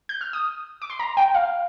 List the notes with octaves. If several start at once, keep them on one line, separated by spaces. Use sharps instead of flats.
G6
F6
D#6
D6
C6
A#5
G5
F5